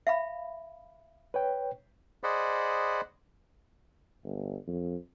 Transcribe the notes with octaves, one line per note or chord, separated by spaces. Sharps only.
E5 F5 B5
B4 C#5 G5
G#4 C5 D5 D#5 F#5 B5
G1
F2